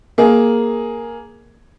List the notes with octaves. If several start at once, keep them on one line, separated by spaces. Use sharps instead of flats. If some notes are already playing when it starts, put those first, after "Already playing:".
A#3 G#4